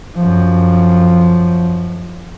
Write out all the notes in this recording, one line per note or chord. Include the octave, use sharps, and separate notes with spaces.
F#2 F3